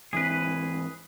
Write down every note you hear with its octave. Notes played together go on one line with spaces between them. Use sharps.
G#2 E3 C4 G#4 B4